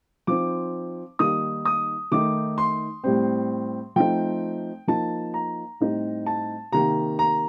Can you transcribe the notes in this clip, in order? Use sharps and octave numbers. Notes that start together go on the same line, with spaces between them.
F3 C4 D#4 D6
D#3 G3 A#3 D#4 D#6
D#6
D#3 A3 D#4 D6
C6
A2 G3 C4
F3 A3 C4 D#4 G5
F3 A#3 D#4 A5
A#5
A2 G3 C4 D#4
A5
C3 D#3 A#3 A#5
A#5